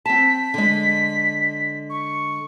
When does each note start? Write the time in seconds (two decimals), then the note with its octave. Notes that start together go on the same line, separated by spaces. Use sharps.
0.06 C4 A5 B6
0.54 D3 G#3
1.90 C#6